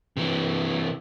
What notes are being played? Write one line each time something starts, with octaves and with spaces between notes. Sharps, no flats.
C3 E3